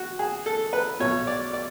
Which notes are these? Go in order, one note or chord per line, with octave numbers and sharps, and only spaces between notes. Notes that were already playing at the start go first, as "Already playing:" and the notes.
Already playing: F#4
G#4
A4
B4
B1 B2 C#5
D5
D5